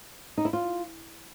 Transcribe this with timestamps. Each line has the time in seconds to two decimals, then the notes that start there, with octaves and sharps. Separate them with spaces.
0.38 D#4
0.45 E4
0.53 F4